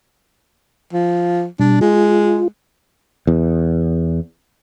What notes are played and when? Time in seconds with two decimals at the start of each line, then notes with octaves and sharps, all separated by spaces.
0.93 F3
1.60 B2 G3 D4
1.81 G#3 F4
3.27 E2